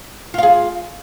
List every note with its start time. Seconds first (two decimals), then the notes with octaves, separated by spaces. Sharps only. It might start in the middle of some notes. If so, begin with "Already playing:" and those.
0.34 F4
0.38 F5
0.43 G#4